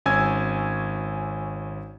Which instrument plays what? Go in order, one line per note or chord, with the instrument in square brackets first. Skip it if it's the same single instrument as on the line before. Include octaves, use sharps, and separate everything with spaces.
[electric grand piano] G#1 C#4 G#5 E6 G#6